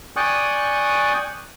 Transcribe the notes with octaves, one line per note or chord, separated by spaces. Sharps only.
D5 G5 G#5 C#6 D#6 F#6